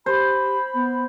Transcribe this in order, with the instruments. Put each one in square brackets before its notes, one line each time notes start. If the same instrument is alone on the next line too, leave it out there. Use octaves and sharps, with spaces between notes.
[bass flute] G4 [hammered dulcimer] C5 [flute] B5
[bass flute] B3